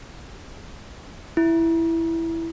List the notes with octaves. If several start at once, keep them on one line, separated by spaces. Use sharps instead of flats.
E4